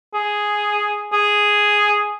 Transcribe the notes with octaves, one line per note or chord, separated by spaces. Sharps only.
G#4
G#4